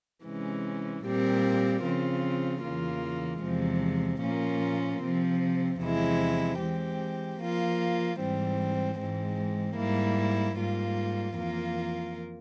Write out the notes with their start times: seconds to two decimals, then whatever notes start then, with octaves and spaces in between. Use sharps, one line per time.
0.25 C3 E3 G#3 C#4
1.04 A#2 G3 C4 G4 A#4
1.84 C#3 F3 C4 F4
2.63 E2 C#3 E3 A#3 F4
3.42 E2 C3 F3 G#3
4.22 A#2 F3 A#3 C#4 F4
5.01 C3 F3 C4
5.81 E2 C3 F3 G#3 E4
6.59 E3 G#3 C4 G4
7.39 F3 A#3 F4
8.18 G#2 E3 G3 C4
8.99 G#2 E3 G#3 C4
9.77 G#2 G3 A#3 E4
10.57 G#2 G3 A#3 F4
11.36 F2 E3 A#3 F4 A#4